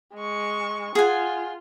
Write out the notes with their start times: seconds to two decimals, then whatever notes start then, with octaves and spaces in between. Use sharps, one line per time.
0.15 G#3 C#6
0.95 F4 G#4 F#5 G#5